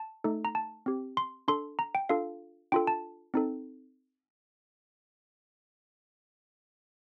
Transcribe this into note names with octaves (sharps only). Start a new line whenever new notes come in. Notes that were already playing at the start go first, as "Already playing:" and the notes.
Already playing: A5
A3 D#4 A4
A#5
A5
C4 G4
C6
D4 A4 C6
A#5
G5
D4 F4 A4 F5
D4 F4 A4 G5
A5
C4 D#4 A4